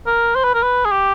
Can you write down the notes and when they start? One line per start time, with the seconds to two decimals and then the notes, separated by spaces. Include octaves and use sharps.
0.06 A#4
0.35 C5
0.44 B4
0.54 A#4
0.63 B4
0.85 G#4
0.91 G4